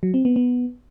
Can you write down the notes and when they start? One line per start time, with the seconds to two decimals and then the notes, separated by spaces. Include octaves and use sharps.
0.03 F#3
0.14 C4
0.25 B3
0.36 B3